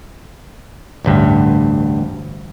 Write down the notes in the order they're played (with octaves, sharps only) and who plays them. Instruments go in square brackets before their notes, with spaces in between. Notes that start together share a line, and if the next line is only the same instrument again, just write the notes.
[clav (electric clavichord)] A1 D2 G2